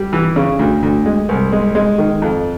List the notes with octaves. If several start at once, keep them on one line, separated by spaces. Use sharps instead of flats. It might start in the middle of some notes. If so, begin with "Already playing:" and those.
Already playing: G3
E3
C#3
D2
D2
G#3
C2
G#3
G#3
D#3
F2